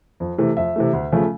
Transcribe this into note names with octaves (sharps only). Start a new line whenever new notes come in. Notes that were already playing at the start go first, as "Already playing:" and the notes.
F2
C3 E3 A3
F2 E5
C3 E3 A3
D2
C#3 F3 A3